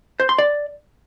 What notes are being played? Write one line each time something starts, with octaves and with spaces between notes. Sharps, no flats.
C5
C6
D5